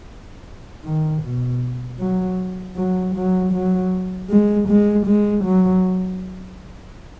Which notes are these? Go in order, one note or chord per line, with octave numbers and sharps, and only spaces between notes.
D#3
B2
F#3
F#3
F#3
F#3
G#3
G#3
G#3
F#3